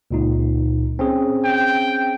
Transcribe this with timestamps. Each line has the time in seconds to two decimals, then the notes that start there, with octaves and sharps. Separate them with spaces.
0.11 C#2 A#2 D#4
0.99 C4 C#4 G#4
1.45 G5